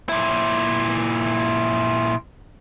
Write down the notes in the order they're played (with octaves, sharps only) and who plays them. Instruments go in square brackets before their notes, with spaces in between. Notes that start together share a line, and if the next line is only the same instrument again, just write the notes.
[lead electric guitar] A#2 E4